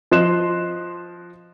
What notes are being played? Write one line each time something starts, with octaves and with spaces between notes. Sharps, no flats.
F3 D#5 C6 F#6 E7